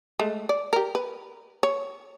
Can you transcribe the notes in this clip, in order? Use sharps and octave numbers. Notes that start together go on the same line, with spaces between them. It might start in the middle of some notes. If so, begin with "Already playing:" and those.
G#3 A3
D5
G4 A#4
B4
C#5